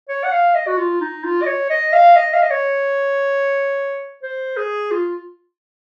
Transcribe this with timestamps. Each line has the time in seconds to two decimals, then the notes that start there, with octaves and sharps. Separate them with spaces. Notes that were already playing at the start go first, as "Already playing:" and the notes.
0.09 C#5
0.24 F#5
0.32 F5
0.55 D#5
0.67 F#4
0.78 F4
1.01 D#4
1.24 F4
1.42 D#5
1.47 C#5
1.70 D#5
1.93 F5
2.16 D#5
2.33 F5
2.42 D#5
2.50 C#5
4.22 C5
4.57 G#4
4.91 F4